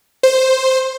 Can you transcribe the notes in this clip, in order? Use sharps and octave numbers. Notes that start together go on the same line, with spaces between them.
C5